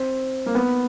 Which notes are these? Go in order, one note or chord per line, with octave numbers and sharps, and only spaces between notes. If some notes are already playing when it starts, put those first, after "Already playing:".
Already playing: C4
A#3
B3